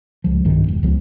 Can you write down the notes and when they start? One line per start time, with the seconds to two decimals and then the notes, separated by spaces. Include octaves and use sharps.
0.24 C#2 F3
0.45 B1 G2 D#3
0.68 E1
0.83 C#2 F3 B3